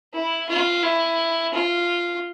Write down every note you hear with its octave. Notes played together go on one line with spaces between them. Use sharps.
E4
F4
E4
F4